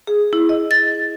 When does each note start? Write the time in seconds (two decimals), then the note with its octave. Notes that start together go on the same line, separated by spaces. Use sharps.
0.07 G#4
0.33 E4
0.49 D#5
0.71 A6